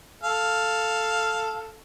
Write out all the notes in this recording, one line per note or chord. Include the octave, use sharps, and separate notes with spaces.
A4 F5